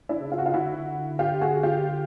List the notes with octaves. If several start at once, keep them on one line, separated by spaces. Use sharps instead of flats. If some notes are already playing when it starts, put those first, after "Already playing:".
D4 E4
C#3
F4
F#4
D#4 F4
D3 E4 F#4
F4 G4
F#4 G#4
F4 G4